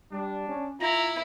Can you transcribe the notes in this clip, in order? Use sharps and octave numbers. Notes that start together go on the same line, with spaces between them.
G3 D4
C#4
E4 F4 A#5